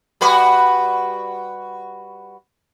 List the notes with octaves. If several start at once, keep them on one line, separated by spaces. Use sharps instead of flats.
G3 F#4 B4